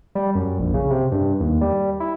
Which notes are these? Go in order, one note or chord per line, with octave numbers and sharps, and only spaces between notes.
G3
F#2
A#1
C#3
C3
G2
D#2
G3
E4